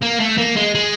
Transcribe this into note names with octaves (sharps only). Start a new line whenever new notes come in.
A#3
A3
A#3
G#3
G#3